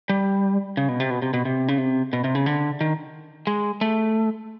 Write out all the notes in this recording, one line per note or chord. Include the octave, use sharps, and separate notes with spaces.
G3
C#3
B2
C3
B2
C3
B2
C3
C#3
C3
B2
C3
C#3
D3
D#3
G#3
A3